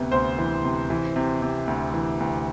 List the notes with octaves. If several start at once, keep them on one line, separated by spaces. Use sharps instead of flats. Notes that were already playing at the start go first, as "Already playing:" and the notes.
Already playing: D2 C3 B3
D2 C5
E3
C3
E3
C3
C3
D2
E3
D2